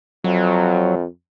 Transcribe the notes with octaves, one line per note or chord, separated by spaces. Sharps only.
F2 F#3